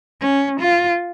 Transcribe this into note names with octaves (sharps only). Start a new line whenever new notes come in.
C#4
F4